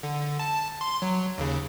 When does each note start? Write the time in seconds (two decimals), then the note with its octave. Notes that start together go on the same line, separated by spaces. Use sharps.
0.03 D3
0.39 A5
0.81 C6
1.02 F#3
1.38 D#2 C#3